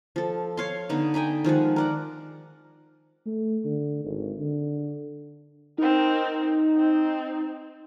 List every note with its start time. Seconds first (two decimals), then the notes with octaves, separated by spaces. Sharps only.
0.16 F3 A4
0.57 C#5 F5 C6
0.89 D3 B3 D#4
1.14 G5 G#5 A#5 B5
1.44 D#3 F3 G#3 F#5
1.76 A#4 D5 F#5
3.26 A3
3.65 D3
4.04 G#1
4.38 D3
5.78 C4 D#4 A#4
6.77 C4